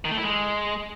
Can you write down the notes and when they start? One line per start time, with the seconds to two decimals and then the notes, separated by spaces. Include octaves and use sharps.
0.05 D#3
0.11 A3
0.17 E4
0.24 G#3